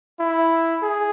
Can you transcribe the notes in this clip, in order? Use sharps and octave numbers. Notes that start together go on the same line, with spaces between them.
E4
G#4